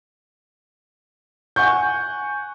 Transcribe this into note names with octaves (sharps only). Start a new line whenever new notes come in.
F#5 G#5 C#6 G6